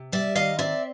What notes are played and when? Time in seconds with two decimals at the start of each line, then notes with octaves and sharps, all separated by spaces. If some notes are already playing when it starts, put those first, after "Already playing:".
Already playing: C3
0.12 G3 D5 E5
0.35 D#3 D#5 F5
0.59 C4 D5 E5